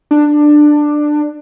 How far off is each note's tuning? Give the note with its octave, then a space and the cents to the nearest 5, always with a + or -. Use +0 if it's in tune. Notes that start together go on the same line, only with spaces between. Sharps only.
D4 +15